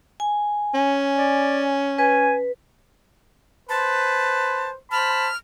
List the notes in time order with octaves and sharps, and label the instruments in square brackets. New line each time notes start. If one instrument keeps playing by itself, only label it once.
[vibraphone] G#5
[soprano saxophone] C#4
[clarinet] D5
[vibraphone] B4 [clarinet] G#5
[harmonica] B4 C5 [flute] A5
[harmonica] C5 A5 B5 [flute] F6